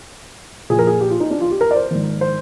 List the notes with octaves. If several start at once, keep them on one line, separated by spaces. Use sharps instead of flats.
A#2 F3 G#4
A#4
G#4
G4
F4
D#4
D4
F4
G4
A#4
D5
C5
G#2 D#3
C5